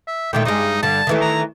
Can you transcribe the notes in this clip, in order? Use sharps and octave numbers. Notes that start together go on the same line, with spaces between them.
E5
A#2 D#3 A3 G5
G2 G#3 D#4
G2 D3 A5
D#3 E3 A3
A#5